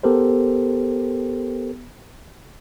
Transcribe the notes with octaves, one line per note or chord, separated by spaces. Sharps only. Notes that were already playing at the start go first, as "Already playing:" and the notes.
B3 G4 A4 A#4 C5